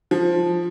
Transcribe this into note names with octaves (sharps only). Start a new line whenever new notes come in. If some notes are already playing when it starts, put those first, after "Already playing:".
F3